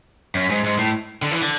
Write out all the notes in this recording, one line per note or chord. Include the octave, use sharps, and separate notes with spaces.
F#2
G#2
G#2
A2
D3
E3
D3